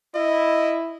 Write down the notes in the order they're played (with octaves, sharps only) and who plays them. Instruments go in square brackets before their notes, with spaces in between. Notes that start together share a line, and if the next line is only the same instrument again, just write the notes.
[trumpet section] E4 [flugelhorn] D#5